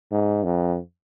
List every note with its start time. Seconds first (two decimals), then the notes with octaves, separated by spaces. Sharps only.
0.12 G#2
0.44 F2